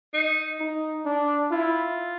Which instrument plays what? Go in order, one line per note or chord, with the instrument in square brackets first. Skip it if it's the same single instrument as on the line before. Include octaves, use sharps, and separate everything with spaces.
[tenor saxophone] D#4
[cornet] D#4
D4
[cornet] E4 [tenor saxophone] F4